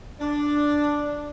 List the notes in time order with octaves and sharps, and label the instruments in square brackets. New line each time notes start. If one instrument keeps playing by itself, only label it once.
[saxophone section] D4